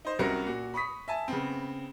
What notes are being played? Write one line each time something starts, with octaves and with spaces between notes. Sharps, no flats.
D#4 C5
C2 C3 C#4 F#4 A#4 C#7
A#2 F#4
B5 C#6 D#6 B6
E5 G#5 A5
C#3 B3 C4